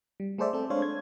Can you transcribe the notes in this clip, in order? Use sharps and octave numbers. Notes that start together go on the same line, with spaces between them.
G3
A3 G#4 A4 C5 D5 E5
C4 A4
G#3 D4 C5 C#5 F5
G#6